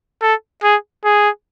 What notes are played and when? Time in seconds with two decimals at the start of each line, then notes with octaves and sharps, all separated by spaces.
0.22 A4
0.63 G#4
1.04 G#4